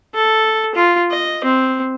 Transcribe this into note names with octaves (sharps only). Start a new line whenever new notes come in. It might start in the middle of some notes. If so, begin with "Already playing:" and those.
A4
F4
D#5
C4